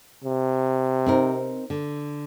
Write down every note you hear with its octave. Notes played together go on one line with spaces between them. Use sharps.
C3
C4 D#4 A#4
D3